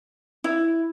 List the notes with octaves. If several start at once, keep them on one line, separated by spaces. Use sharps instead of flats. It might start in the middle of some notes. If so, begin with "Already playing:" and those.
E4